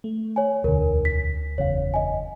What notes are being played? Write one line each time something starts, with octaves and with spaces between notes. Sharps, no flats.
A3
C#5 G#5
E1 D2 D3 A#4
B6
F#1 E2 C#3 C#5 F5
D#5 G#5